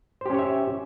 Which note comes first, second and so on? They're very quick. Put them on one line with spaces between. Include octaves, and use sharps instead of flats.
C5 G4 C#4 C#5 E5